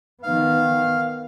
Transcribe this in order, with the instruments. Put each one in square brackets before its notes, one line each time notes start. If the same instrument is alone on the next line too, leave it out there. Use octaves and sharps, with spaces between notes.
[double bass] D#3 B3 [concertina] F5